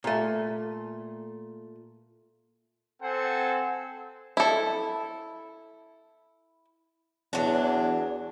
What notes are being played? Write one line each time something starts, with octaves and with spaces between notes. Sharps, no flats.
A#2 A3
C4 A4 C5 F#5 G#5
E4 A4
E2 F#3 D4